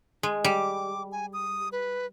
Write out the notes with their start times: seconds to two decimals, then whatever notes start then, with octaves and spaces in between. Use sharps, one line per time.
0.23 G#3
0.44 G3 D6
1.12 G#5
1.33 D#6
1.72 B4